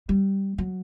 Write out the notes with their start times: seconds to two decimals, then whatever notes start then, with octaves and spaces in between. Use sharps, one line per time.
0.09 G3
0.58 F#3